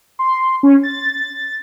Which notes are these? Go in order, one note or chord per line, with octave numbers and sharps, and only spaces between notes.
C6
C#4
A6